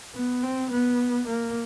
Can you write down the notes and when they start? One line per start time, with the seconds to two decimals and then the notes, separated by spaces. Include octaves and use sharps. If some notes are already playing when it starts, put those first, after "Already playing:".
0.14 B3
0.43 C4
0.71 B3
1.28 A#3